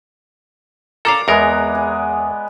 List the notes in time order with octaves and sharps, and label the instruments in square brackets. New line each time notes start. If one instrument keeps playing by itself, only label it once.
[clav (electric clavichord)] A4 F5 [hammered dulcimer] A#4 D5 [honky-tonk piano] A#5 D6
[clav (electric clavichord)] E2 A#4 [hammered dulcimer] G#3 B3 B4
[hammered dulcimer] G#4